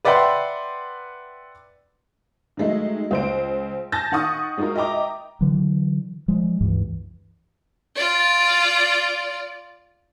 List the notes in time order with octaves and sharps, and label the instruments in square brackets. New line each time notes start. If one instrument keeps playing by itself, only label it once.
[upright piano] B4 D5 E5 F#5 G5 C6
[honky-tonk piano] D#3 F#3 G#3 A3 D#4
C#2 C5 D7
G#5 A5 G6 A6 A#6
D#3 F#5 C#6 D#6
G#3 D#4 F4 F#4 A#4
D#5 E5 G5 A#5 D6
[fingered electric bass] D3 E3 F#3
F3 G#3
C#2 G2 E3
[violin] F4 D5